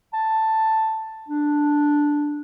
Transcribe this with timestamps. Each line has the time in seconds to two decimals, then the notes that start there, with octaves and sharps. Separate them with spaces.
0.13 A5
1.29 D4